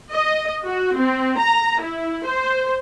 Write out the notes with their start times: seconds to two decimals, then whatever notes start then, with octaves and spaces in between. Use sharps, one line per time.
0.11 D#5
0.66 F#4
0.97 C4
1.40 A#5
1.81 E4
2.25 C5